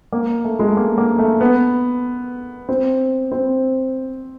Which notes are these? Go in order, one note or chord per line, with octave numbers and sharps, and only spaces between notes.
A#3
A3
G#3
A3
A#3
A#3
A3
B3
C4
C4